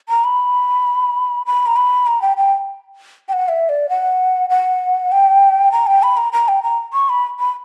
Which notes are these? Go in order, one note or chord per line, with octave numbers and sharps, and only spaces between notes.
A#5
B5
B5
A#5
B5
A#5
G5
G5
G5
F#5
E5
D5
F#5
F#5
G5
A#5
G5
B5
A#5
A#5
G5
A#5
C#6
B5
B5